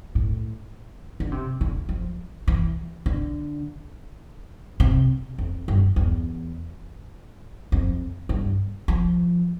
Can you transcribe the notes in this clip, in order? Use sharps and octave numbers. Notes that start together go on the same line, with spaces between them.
A2
D3
C3
D3
F3
E3
D3
C3
F2
G2
E2
F2
G2
F3